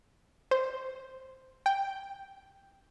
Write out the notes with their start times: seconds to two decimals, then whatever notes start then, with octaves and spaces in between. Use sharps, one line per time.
0.51 C5
1.66 G5